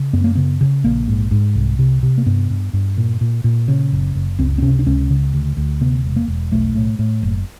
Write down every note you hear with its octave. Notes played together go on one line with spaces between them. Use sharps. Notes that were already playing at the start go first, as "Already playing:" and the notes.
Already playing: C#3
F#2 B3
A#3
C#3 B3
C#3
A#1 A#3
G#2
G#2
C2
C3
C3
A#3
G2 B3
G2
G2
A#2
A#2
A#2
C#3
F#1
F#1
C#2 C4
C4
C3 C#4
D4
C#2 C#4
C#3
D2
D2
C3 B3
E1
A#3
E1
B1 A3
A2
A2
F#1